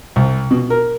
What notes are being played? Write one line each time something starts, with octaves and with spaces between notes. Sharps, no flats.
C2
B2
A#4